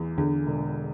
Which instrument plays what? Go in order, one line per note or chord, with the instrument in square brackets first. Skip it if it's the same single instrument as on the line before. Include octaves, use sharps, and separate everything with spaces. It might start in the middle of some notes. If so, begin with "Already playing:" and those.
Already playing: [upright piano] E2 E3
[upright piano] E2 [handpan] D3
[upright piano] E1